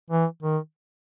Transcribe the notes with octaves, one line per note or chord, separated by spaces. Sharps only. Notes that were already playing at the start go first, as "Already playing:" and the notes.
E3
D#3